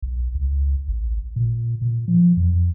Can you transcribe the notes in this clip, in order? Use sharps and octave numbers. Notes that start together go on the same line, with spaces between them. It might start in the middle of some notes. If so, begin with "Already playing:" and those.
B1
C#2
A1
A#2
A#2
F3
F2